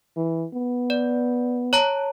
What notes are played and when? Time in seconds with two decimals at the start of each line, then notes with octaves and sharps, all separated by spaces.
0.16 E3
0.53 B3
0.90 D5
1.73 C#5 A5 A#5